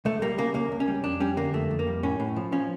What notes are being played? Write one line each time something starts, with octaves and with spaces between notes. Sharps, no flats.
C#2 A3
G3 A#3
C#3 A#3
C#2 A#3
C#2
C#4
G3
F2 D4
G3 C#4
D3 A#3
F2 A3
F2
A#3
G3
A2 C#4
A2
F3
F3 C#4